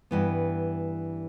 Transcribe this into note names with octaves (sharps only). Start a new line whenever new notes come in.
G2 E3 B3